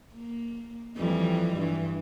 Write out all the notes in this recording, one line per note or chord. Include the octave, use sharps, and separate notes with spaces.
A#3
F2 E3 G3
G2 E3